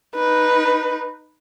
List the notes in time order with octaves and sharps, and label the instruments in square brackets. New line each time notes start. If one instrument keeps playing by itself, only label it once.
[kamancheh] D#4 B4